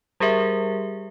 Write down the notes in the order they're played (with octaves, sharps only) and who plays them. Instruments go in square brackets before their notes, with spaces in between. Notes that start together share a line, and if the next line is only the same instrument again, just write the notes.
[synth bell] G3 G4 G#4 A#4 E5